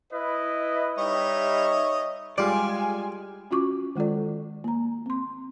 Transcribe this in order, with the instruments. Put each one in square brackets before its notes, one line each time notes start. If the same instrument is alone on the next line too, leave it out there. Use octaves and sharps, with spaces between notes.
[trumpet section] E4 B4 D#5
[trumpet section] G3 D#4 E5 [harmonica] C#5 D#5
[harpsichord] G3 [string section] G#3 G#5 [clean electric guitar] F4 D5
[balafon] C#4 F4 F#4 C#6 D6
D#3 G#3 F4 A4 D5
A#3 A#5
C4 C6